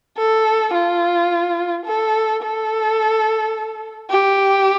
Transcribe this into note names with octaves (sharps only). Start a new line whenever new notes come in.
A4
F4
A4
A4
G4